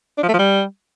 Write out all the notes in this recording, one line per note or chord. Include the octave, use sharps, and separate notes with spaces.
D4
F3
A3
F3
G3